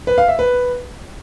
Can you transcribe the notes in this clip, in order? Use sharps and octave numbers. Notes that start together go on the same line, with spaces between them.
B4
F5
E5
B4